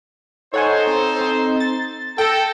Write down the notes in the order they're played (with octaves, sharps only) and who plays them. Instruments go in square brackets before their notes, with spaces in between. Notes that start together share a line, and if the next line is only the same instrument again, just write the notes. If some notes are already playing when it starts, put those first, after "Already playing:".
[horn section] D#4 A4 C5 [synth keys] C#5 F#5 G#5
[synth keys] C4
C4
A6
[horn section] A4 [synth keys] G5 A#6